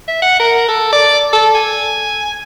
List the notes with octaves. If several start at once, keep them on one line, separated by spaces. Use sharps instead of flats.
E5
F#5
A#4
A4
D5
A4
G#5